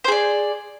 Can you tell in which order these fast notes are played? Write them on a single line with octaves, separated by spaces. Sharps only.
C5 G#4 D5